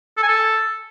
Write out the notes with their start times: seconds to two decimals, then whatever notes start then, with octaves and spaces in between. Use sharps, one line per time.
0.17 A4
0.23 G#5
0.28 A4